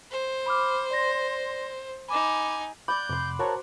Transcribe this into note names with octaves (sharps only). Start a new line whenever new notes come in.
C5
B5 D6 F6
D5 C6 A#6
D#4 G#5 B5 D6 E7
D5 F#5 B5 D6 G6
F2 C3 D5 C6
F#4 A#4 C5 C#5 A5 A#5